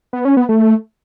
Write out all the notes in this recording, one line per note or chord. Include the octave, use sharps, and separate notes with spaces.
B3
C#4
B3
A3